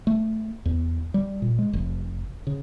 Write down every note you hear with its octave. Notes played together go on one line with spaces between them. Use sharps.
A3
E2
G3
A#2
G#3
F1
C#3